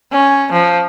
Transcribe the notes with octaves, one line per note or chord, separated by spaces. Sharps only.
C#4
F3